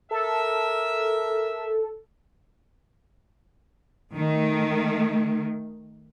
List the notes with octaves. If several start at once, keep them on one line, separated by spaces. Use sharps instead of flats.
A4 A#4 E5
D#3 A3